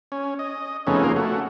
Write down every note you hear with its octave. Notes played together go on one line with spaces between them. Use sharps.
C#4
D#5
F2 C#3 A3 B3 C#4 D#4
A#3 D#4 F4 G#4 A#4
A3 F#4